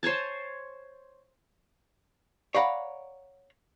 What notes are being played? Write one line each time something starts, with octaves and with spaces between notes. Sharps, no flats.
C5 C#5 G#5 A5
C#5 D5 F5 F#5 A#5 B5